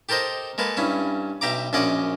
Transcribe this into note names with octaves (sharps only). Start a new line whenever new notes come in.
G4 A4 A#4 C5 D#5
G#3 A#3 A4 B4
G2 C#4 E4
B1 G4 E5 A#5 D6
A#1 F#2 C#4 D#5 F#5 D6